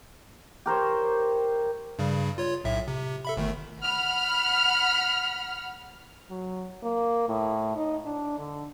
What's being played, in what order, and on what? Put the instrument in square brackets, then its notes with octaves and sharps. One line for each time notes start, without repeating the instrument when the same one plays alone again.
[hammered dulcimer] G4 A#4 C5 C#5
[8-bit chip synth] G2 C#3 G3
F4 C#5
B1 A2 E5
C3
A4 E5 B5
G1 D#3 A3
[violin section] F#5 B5 F6
[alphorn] F#3
A#3
A2
D#4
D4
D3